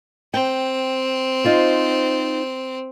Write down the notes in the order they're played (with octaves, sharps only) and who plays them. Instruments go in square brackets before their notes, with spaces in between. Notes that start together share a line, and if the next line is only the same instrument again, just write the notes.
[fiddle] C4 [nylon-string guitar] G5
[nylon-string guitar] D#4 F4 C5